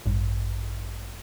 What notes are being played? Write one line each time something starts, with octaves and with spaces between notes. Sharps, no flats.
A1 G2